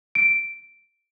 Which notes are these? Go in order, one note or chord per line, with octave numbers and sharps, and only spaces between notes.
D7